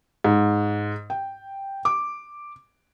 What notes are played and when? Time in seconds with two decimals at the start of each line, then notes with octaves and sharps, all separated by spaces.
0.24 G#2
1.10 G5
1.85 D6